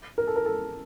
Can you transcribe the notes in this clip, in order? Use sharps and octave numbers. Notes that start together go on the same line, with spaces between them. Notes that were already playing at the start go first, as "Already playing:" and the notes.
A#4
A4
A#4
A4